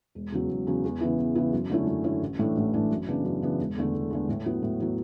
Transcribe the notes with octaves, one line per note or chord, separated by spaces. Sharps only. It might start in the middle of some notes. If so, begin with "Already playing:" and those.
E1
E2 C#3 F#3
E1
E2 C#3 F#3
E2
C#3 E3 B3 E4
E2
C#3 E3 B3 E4
F#2
D3 A3 C#4 E4
F#2
D3 A3 C#4 E4
A1
A2 E3 A3 D4
A1
A2 E3 A3 D4
F#2
C#3 E3 B3 D4
F#2
C#3 E3 B3 D4
E1
E2 D3 A3
E1
E2 D3 A3
A2
F#3 B3 E4
A2
F#3 B3 E4